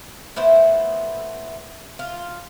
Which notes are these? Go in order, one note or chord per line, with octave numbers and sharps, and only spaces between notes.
A2 B3 E4 C5
F4